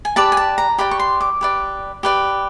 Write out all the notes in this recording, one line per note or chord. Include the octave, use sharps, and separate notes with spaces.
G#5
G4 B4 D5 A5
G#5
A5
A#5
G4 B4 D5 B5
C#6
C6
D6
G4 B4 D5
G4 B4 D5